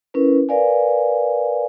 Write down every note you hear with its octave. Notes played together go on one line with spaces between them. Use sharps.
C#4 E4 A#4 B4
A#4 B4 D5 F5 G#5